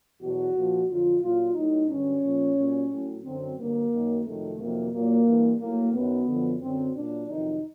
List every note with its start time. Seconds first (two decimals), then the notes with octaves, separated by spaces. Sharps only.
0.20 E2 B2 F#3 F#4
0.53 A#2 F3
0.87 F2 D3 F#3 F4
1.21 A#2 F#3 F4
1.54 A2 F#3 D#4
1.88 G2 D3 F#3 C#4
2.21 A#2 F3
2.55 A#2 F#3
2.89 A2 F#3
3.22 F#2 D3 F#3 C4
3.56 G2 D3 F#3 A#3
3.90 F#2 D#3 F#3
4.23 F2 C3 D#3 F#3 A3
4.58 F2 C3 D#3 F#3 A#3
4.91 A#2 F#3 A#3
5.25 G2 E3
5.59 A2 F#3 A#3
5.92 F#2 D#3 F#3 B3
6.26 F#2 D3 F3
6.59 F#2 D3 F#3 C4
6.94 A#2 F#3 D4
7.28 F2 C3 D#3 F#3 D#4